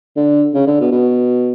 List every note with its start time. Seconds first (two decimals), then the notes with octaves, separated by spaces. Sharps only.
0.16 D3
0.54 C#3
0.67 D3
0.80 B2
0.92 B2